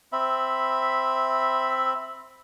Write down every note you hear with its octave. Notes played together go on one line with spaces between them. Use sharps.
C4 E5 B5